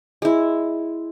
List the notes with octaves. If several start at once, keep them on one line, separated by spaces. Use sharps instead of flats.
G#3 E4